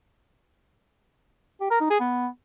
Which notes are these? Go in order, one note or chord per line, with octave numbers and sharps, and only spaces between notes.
G4
A#4
D#4
G#4
B3